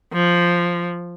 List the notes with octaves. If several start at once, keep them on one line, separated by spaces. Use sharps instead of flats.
F3